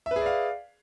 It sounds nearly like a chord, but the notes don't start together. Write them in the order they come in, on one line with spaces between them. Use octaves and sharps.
E5 B4 G#4 D5 F5